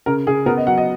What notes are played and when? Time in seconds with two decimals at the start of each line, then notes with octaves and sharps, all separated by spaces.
0.06 C#3 A#4
0.26 C#3 G#4
0.46 B3 A#4
0.57 D#5
0.66 F#3 F#5
0.78 D#5